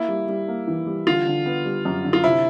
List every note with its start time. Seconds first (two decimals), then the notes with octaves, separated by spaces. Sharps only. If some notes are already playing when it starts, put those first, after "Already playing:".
Already playing: A#3 E4
0.08 G3
0.28 G3
0.48 A#3
0.68 E3
0.87 G3
1.07 D3 F4
1.26 D3
1.46 B3
1.65 G3
1.85 F#2
2.05 D3
2.13 F4
2.24 C3 E4